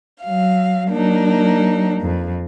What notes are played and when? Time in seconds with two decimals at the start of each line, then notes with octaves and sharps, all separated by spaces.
0.22 F#3 F5
0.89 F#3 A#3 D4 D#4
2.00 F2